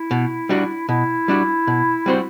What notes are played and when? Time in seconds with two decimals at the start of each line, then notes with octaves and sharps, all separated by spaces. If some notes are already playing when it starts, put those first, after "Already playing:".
Already playing: E4
0.11 B2
0.49 G3 D4 F#4
0.89 B2 E4
1.28 G3 D4 F#4
1.67 B2
2.06 G3 C4 F#4 C5